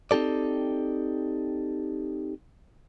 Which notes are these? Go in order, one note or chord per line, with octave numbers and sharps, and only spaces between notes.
C4 D#4 G4 A4 D5